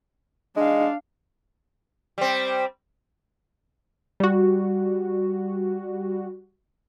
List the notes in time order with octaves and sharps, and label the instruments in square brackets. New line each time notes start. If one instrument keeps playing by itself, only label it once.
[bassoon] G#3 [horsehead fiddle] D4 F5
[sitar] G3 C4
[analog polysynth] G3 F#4